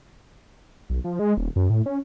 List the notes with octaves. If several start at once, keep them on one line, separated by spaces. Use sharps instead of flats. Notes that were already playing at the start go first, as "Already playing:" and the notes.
B1
F3
G#3
D#1
F#2
A2
C#4